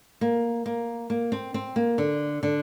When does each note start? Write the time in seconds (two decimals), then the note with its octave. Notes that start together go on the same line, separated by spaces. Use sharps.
0.21 A#3
0.66 A#3
1.10 A#3
1.32 C4
1.54 C4
1.76 A#3
1.98 D3
2.43 D3